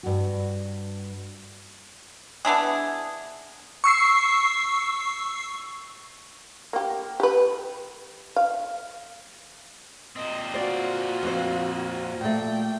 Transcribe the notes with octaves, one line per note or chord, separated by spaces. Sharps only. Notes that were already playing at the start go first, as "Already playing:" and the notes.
G2 F#4
B3 D4 E4 G#4
C#6 E6 C7
A#3 G4
G4 B4
F5
A#2 C4 D#5
F4 F#4 C5 D5
F2 C5
A#2 A3 G5